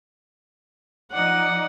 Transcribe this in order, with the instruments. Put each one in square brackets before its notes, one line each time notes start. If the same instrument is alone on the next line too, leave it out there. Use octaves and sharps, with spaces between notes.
[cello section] F3 D#4 D5 [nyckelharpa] F#5